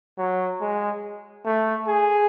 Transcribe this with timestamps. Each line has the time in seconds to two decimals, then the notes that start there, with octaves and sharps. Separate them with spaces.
0.18 F#3
0.61 G#3
1.45 A3
1.87 G#4